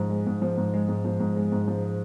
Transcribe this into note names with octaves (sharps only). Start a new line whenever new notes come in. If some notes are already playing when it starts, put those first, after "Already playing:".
Already playing: G#2 F3
G#3
G#2
F3
G#2
G#3
G#2
F3
G#2
G#3
G#2
F3